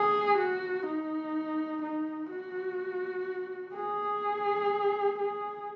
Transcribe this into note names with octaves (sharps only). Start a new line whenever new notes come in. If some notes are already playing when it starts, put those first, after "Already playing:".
Already playing: G#4
F#4
D#4
D#4
F#4
G#4
G#4